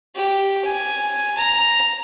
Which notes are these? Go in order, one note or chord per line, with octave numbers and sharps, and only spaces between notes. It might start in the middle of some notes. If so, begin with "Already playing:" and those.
G4
G#5
A#5